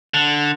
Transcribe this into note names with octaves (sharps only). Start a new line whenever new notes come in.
D3